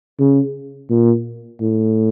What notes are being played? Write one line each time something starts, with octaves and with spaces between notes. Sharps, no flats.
C#3
A#2
A2